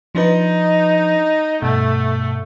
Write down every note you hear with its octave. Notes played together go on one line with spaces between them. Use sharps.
F3 D4 D#4 B4
G2 B2 A3